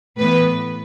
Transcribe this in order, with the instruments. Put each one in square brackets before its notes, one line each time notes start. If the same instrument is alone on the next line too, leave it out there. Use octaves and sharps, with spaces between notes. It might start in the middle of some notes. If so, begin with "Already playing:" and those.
[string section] A2 E3 B3 B4